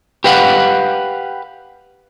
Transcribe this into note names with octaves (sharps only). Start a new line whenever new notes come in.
G4 B4 F5 F#5